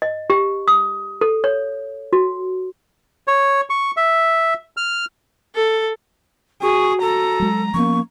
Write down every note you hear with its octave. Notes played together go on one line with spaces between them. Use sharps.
D#5
G4
D#6
A4
C#5
F#4
C#5
C#6
E5
F6
A4
F#4 G#4 C#6
A4 A#5
F#3 G#3
F3 A#3 B3 C#4 C#6